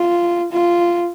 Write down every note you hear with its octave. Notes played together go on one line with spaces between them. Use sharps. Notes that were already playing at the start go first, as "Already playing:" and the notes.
Already playing: F4
F4